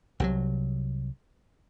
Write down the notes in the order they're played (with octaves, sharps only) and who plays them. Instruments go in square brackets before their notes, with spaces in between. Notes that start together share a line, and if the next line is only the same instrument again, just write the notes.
[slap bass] C2 C3 E3 F#3